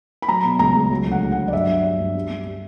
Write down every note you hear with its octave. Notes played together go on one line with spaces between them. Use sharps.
B5
F#3 A#5
B2
C#2 A#5
C#2
F#3
D2
F#5
F#3
F#5
F#3
D5
G2 E5
G3
G3
G2
G3
G3
G3